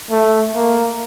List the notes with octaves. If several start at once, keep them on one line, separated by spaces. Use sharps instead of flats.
A3
A#3